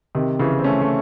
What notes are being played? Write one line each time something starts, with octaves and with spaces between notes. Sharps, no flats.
C3 D#3
C#3 E3
C4
A3 C#4
A3